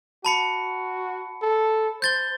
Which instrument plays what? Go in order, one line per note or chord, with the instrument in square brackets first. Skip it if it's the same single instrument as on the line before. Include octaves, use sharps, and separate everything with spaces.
[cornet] F#4 [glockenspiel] A5 B5 C#7
[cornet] A4
[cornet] C5 [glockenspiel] G6 A6 G7